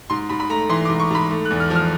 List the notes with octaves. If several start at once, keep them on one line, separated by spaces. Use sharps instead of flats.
G#2 C6
G#2 B5
B5
A3 A#5
E3 C6
D6
G#2
C#6
G#2 B5
A3
F#6
E2
F6
F3
F6